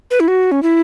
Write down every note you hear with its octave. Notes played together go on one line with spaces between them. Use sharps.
B4
E4
F#4
C#4
E4